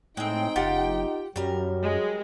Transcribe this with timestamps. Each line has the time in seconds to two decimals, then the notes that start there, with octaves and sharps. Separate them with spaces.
0.17 A2 G#3 C4 D#4 G5
0.56 F#1 F4 G4 F#5
1.36 F#2 F#3 G3 A#4
1.83 G#3